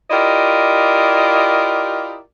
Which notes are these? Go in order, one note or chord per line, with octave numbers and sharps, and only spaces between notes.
E4 F4 G4 A#4 D5 D#5